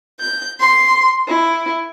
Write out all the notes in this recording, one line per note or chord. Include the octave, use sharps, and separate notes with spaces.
G6
C6
E4